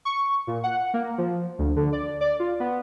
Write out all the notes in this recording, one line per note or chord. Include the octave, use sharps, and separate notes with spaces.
C#6
A#2
F#5
A#3
F3
D2
D3
D5
D5
F4
B3